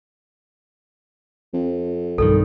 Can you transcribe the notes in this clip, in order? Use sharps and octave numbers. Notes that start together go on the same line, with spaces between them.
F2
B1 G2 D#3 A4